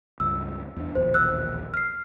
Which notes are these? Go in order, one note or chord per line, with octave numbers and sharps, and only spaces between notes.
C#2 G2 E6
E2 D4
E1 A#1 D#2 C5
E6 F#6
F6 C7